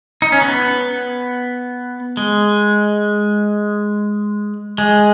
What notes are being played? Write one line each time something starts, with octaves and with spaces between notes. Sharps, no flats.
D#4
C#4
B3
G#3
G#3